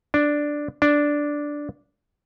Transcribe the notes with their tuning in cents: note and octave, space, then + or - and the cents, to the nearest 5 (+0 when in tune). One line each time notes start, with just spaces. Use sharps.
D4 +0
D4 -5